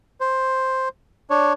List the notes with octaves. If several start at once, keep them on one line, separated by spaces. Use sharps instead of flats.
C5
D4 C#5